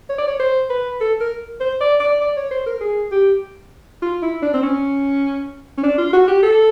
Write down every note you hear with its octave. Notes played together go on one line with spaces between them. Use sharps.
C#5
D5
C#5
C5
B4
A4
A#4
C5
D5
D5
D5
C#5
C5
A#4
G#4
G4
F4
E4
D4
C4
C#4
C#4
D4
F4
F#4
G4
A4